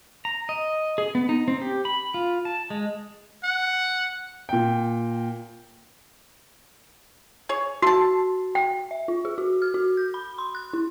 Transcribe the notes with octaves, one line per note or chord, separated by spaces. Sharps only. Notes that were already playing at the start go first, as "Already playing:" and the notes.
A#5
D#5
G#4
B3
D#4
C4
G4
B5
F4
A5
G#3
F#5
A#2 G5
G#4 C#5
F#4 A4 A5
G5
E5
F4
G#4
F#4
F6
F#4
G6
B5
C6
F#6
E4